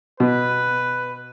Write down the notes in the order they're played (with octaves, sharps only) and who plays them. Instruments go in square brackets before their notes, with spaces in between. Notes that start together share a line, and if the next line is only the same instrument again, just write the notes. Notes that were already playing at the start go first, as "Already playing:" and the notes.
[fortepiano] B2 [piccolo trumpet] B4